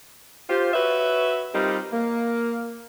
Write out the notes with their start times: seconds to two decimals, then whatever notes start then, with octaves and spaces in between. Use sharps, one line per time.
0.49 F4 G4 C5
0.74 F#4 B4 C#5 E5
1.54 G3 C4 D#4 F4 G4 A#4
1.93 A#3